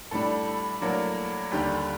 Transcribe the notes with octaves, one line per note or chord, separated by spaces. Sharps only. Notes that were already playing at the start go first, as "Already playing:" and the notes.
A2 G3 D4 A4
A2 F#3 A#3 D4
D#2 D3 G3 D4 G4